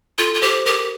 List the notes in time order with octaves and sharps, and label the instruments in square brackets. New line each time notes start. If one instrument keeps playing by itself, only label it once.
[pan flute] F4 [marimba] A4
[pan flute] F4
[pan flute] G4 [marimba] C5
[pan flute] G4 [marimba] A#4